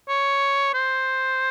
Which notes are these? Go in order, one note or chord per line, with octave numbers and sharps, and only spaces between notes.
C#5
C5